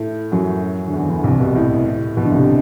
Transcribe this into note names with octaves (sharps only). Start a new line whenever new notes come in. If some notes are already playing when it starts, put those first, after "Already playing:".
Already playing: A2 A3
F#2 F#3
D3
E2 E3
D2 D3
C2 C3
B2
A2
B2
D3
C2 C3